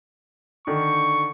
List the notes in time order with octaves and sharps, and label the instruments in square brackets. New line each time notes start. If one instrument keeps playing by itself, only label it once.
[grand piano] D3 D#3 [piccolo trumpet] C#6